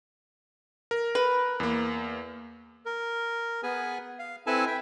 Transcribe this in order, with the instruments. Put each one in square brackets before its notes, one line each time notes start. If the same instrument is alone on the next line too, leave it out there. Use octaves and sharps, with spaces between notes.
[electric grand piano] A#4
[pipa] B4
[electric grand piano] E2 A#3
[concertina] A#4
B3 G#4 B4 G#5
F5
C4 E4 A4 B4 G#5 A5
E5 G5